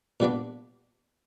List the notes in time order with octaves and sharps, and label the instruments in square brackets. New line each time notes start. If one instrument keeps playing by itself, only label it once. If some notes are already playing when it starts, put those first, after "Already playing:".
[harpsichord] A#2 G3 B3 D4